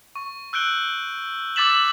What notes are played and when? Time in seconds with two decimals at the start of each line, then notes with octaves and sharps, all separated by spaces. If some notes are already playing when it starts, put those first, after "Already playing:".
0.15 C#6
0.53 E6 F#6 G6 D7 G7
1.56 D6 E6 A6 B6 E7 F#7